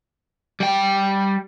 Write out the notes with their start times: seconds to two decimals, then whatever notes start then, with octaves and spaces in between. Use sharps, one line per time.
0.60 G3 G5